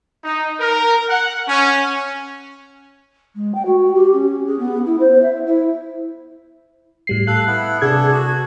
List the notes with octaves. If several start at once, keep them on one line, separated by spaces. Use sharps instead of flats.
D#4
A#4
F#5
C#4
G#3
G5
F#4
G4
C#4
G#4
B3
E4
C5
E5
E4
A2 G3 C7
A4 F5 F#6
B3 E4
C3 B3 D4 G#4 A4 G#6
F#4